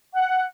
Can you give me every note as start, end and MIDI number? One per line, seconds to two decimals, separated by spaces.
0.13 0.43 78